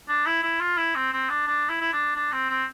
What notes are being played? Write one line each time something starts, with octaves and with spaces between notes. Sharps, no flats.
D4
E4
E4
F4
E4
C4
C4
D4
D4
E4
E4
D4
D4
C4
C4